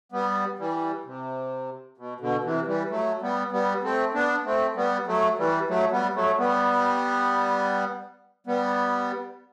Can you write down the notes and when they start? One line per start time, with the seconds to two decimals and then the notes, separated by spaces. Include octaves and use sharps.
0.12 G3 B3
0.59 E3 G3
1.05 C3
1.98 B2
2.20 B2 D3
2.44 C3 E3
2.67 E3 G3
2.90 F#3 A3
3.22 G3 B3
3.52 G3 B3
3.83 A3 C4
4.14 B3 D4
4.45 A3 C4
4.76 G3 B3
5.07 F#3 A3
5.38 E3 G3
5.69 F#3 A3
5.92 G3 B3
6.15 F#3 A3
6.38 G3 B3
8.47 G3 B3